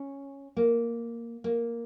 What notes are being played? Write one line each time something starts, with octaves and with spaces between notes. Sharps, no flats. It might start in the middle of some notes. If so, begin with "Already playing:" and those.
Already playing: C#4
A#3
A#3